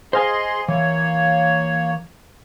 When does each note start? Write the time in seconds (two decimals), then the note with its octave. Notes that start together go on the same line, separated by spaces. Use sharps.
0.13 G#4 C5 D#5 F5 G#5 C6
0.68 E3 A#3 C#5